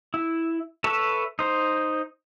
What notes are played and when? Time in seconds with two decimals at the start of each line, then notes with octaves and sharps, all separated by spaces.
0.14 E4
0.84 A4 B4 C#5 E5 A5
1.39 D#4 C5